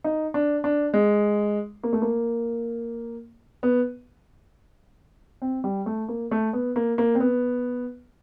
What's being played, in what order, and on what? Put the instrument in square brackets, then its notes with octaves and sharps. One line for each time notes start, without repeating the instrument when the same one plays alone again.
[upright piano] D#4
D4
D4
G#3
A#3
A3
A#3
B3
C4
G3
A3
A#3
A3
B3
A#3
A#3
C4
B3